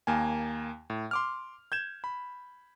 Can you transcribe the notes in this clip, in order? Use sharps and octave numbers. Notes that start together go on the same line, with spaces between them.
D#2 A#3 G#5
A2
C6 D6 F6
G6 G#6 E7
B5